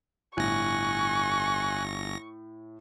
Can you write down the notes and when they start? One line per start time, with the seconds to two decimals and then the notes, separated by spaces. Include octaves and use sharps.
0.37 G1 A2 G#5 C#6 F#6 A#6